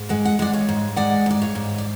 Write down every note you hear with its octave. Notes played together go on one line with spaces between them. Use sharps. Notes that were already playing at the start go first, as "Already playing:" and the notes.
Already playing: G#2
G#3 F#5
F#5
G#3 D5 F#5
C#5 F5
G#2
G#3 D5 F#5
G#2 D5
C#5 F5
G#2
D5